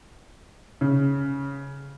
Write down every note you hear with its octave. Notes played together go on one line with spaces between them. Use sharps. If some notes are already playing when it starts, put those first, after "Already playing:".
C#3